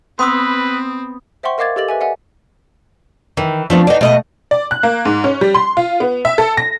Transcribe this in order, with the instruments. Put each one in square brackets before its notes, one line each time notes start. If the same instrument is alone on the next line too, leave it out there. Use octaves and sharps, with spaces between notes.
[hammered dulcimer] B3 [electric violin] C4 [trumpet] B4 [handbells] C6 D#6 E6
[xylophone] C5 E5 F#5 G5 C6 C#6
A#4 D#5 F5 D6 G#6 A6
G4 A4 D#5 A6 F#7
B4 E5 G#5
D5 E5 F#5 G#5
[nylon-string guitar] D#3 D#4 [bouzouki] E3
[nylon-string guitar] F3 D4 [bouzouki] A3 B3 C4
[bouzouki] D4 D#4 [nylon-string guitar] B4 F#5 G#5
[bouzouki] B2 D#5 F#5 [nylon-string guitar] A3
[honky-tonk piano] D5
F#6
A#3
G#2
C#4
G3
C6
F4
B3
E5
A4
A#6